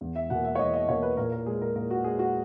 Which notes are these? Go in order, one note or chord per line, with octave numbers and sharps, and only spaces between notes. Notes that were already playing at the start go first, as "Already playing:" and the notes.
E2
E5
B2 A#3 F#5
E5
C#5
E2 D#5
D#5
B2 A#3 C#5
B4
A#2 A#4
A#4
G#3 G#4
A#4
A#2 A#4
F#4
G#3 G#4
F#4